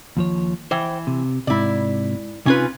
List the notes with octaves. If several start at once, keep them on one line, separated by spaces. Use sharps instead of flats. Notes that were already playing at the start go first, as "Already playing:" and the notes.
D#2 F3 C#5
E3 C5 G5
C3
G#2 C3 E4 D5
C3 C#4 D#4 F4 B4 G#5